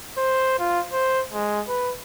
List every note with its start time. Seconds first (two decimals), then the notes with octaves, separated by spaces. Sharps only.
0.18 C5
0.59 F4
0.93 C5
1.33 G#3
1.68 B4